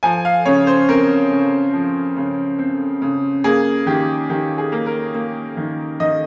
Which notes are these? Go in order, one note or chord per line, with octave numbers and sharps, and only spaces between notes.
F3 G#5
F5
C#3 C#5
C5
C4 A#4
C#3
F3
C#3
C4
C#3
A#3 G#4
D#3 G4
D#3 G4
G#4
A#3
A#4
A#3
D#3
D#3 D#5